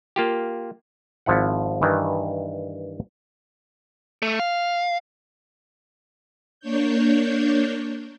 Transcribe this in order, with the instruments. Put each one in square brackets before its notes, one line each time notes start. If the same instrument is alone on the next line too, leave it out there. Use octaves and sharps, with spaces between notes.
[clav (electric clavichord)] A#3 F4 G4
G#1 F3 E4 F#5
G2 D#3 E3
[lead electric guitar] A3
F5
[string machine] A#3 D4 C#5 G6